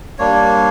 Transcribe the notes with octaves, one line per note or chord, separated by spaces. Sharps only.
G3 A#3 D4 C#5